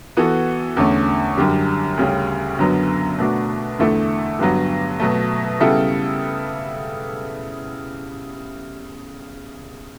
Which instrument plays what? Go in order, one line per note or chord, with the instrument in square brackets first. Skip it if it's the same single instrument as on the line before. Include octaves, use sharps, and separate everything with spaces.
[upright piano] E3 B3 F#4 A4
E2 D3 A3 C#4
F#2 D3 G3
D2 C#3 G3 C#4
F#2 D3 F#3 B3
B2 A3 D4 F#4
E2 D3 A3 E4 A4
G2 D3 F#3 B3
B2 F#3 A3
C#3 G3 B3 E4 A4